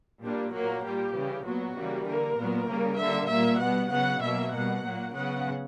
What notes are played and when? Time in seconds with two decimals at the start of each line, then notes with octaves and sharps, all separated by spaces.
0.23 A#2 G3 A#3 D4
0.54 A#2 F#3 A#3 F#4
0.84 A#2 G3 A#3 G4
1.15 C#3 E3 G3
1.45 A#2 F#3 B3 F#4
1.77 C#3 E3 G3 A#3
2.07 D3 A#3 A#4
2.38 A#2 F#3 B3
2.69 C#3 G3 A#3
2.99 D3 G3 A#3 E5
3.30 A#2 G3 A#3 E5
3.60 B2 G3 B3 F#5
3.91 C#3 F#3 B3 F#5
4.22 B2 F#3 A#3 E5
4.52 B2 G3 A#3 F#5
4.83 A#2 F#3 A#3
5.14 C#3 F#3 B3 F#5